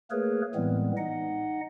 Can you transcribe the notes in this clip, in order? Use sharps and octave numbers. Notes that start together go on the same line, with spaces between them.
A3 A#3 G#4 A#4 B4 C#5
A2 E3 G3 G#3 B3 C4
D#4 D#5 F#5